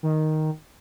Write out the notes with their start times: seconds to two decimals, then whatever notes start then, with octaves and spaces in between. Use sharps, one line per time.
0.03 D#3